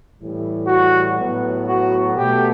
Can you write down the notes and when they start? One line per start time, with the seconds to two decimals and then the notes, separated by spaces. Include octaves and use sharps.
0.18 A2 E3 G3
0.67 F#4
1.18 A2 F#3 B3
1.67 F#4
2.15 B2 A3 G4